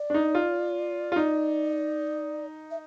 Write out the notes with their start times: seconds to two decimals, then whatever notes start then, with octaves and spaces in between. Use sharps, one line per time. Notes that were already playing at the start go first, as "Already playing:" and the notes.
Already playing: D5
0.10 D4
0.14 D#4
0.35 F4
1.12 F4
1.16 D#4 D5
2.71 E5